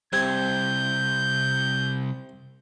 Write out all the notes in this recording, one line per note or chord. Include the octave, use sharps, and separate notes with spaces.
C2 C3 C4 G6 G#6